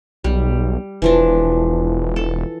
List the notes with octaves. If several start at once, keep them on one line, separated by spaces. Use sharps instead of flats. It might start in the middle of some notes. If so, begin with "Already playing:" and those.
B1 G3
E1 E3 F3 D4
A4